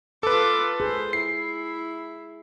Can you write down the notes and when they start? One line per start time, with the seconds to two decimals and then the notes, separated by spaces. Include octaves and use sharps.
0.23 F4 A4 B4 D6
0.80 G#4 C5
1.13 E4 C7